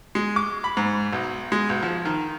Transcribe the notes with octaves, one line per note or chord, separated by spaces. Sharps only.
G#3
D6
B5
G#2
B1
G#3
B1
F3
D#3